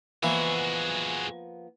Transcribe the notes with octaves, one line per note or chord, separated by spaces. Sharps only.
E3 F3 G#3 A#3 B3 F#4